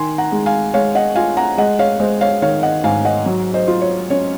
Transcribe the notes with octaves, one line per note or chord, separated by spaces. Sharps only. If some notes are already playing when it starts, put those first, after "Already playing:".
Already playing: D#3 G#5 C6
F#5 A#5
G#3
F5 G#5
G#3 C#5 F5
D#5 F#5
F4 F5 G#5
F#5 A#5
G#3 D#5 F#5
C#5 F5
G#3 C5 D#5
C#5 F5
D#3 C#5 F5
D#5 F#5
G#2 F5 G#5
D#5 F#5
F#3
C5 D#5
F4
C#5
C#4 C#5